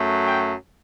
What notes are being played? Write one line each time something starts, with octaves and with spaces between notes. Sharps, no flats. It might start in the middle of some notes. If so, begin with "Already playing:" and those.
Already playing: F#2 F#3 A3
G5